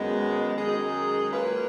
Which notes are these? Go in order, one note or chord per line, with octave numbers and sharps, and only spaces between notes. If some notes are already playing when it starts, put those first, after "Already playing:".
Already playing: F#2 D#3 G#3 B3
F#2 D#3 G#3 D#4 G#4
F#3 A#3 F4 B4